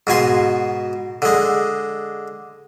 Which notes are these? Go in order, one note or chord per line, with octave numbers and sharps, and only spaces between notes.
G#2 B2 G#5 C6
D3 G#3